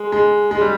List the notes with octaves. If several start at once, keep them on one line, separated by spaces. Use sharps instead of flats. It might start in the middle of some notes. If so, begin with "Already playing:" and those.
Already playing: G#3
G#3
G#3
G3